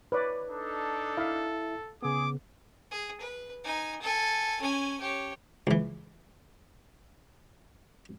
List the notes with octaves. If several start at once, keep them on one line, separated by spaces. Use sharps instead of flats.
B4 C#5 D5
D4 D#4 A4
E4 E5 F5
C#3 B3 G#4 D6
G#4
B4
D#4 G#5
A4 G#5
C#4 G#5
G4 C#5
C#2 E3